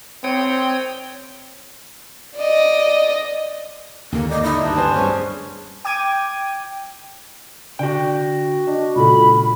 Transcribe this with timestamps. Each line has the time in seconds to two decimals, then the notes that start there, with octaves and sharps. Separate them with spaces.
0.24 C4 C#5 G5 D#6
2.36 D5 D#5
4.12 D#2 G#2 D3 A#3
4.30 D5 D#5
4.43 D#4 E4
4.62 D2 G2 D4
4.76 B3 C5 G#5 A5
4.95 G2 G3 C#4 G#4
5.85 G5 D6 G#6 D#7
7.79 D3 F#4 D5 G5
8.67 D4 D#5
8.95 C#2 A#2 A4 B5